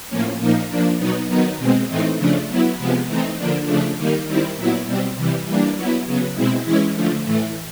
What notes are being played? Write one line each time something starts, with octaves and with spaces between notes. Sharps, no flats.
A2 F3 A#3 C#4
A#2 F3 A#3 D#4
F3 A#3 D4
B2 F#3 B3 D#4
D#3 F#3 B3 D#4
B2 G#3 C4
A2 E3 A3 C4 D#4
C#3 F3 A3 D4
F#3 B3 E4
C3 F3 G#3 B3
E3 A3 C4 D#4
D3 F3 A#3 D4
C#3 F3 A3 D4
D#3 G3 A#3 D#4
D#3 G3 C4 E4
A#2 F#3 B3 E4
B2 G3 C4
C3 E3 G3
E3 G3 A#3 D4
F#3 B3 E4
C#3 F#3 B3
B2 G#3 C4 E4
E3 G#3 C#4 E4
D3 F3 A3
A2 E3 A3